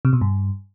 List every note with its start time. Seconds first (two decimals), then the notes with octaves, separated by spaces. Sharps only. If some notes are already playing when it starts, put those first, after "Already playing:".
0.05 C3
0.13 B2
0.21 G2